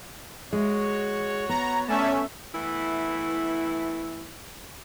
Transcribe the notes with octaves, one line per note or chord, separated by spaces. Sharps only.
G#3 F#4 C#5
B3 A#5
A3 C#4 D4 D5 E5 A5
E3 A3 B3 E4